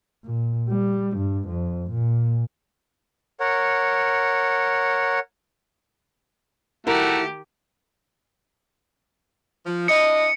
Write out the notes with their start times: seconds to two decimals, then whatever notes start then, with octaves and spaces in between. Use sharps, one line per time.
0.24 A#2
0.69 G3
1.16 G2
1.48 F2
1.90 A#2
3.40 A#4 C#5 F#5
6.87 D#3 A3 E4 F#4 G4 A#4 A#5
9.65 F3
9.88 D4 E4 D#5 C#7